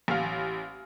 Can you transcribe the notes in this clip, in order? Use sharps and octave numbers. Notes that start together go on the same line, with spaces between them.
A1 F5